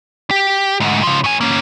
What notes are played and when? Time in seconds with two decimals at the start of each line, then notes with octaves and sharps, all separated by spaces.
0.31 G4
0.80 D2 G#2
1.03 C#3 F3
1.24 A2 G#5
1.41 A#3 C#4